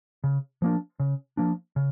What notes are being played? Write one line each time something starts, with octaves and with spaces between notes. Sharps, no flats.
C#3
F3 A#3 D4
C#3
F3 A#3 D4
C#3